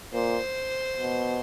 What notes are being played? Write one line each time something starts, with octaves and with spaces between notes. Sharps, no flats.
A#2 C5
B2